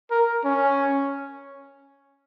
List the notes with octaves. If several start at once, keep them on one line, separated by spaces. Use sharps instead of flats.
A#4
C#4